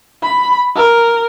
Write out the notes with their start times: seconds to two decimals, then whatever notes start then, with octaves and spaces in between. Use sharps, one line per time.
0.23 B5
0.75 A#4